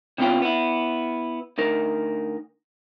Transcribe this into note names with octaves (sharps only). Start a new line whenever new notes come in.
C3 B3 C#4 F4 G5
B3 E4
D2 D#4 A#4